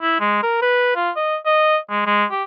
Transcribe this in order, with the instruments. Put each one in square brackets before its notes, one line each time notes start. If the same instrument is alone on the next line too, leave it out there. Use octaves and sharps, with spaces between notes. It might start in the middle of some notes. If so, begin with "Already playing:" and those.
[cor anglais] E4
G#3
A#4
B4
F4
D#5
D#5
G#3
G#3
G4